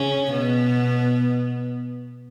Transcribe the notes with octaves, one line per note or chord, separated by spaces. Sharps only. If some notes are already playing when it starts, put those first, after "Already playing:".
Already playing: C#3 C#4
B2 B3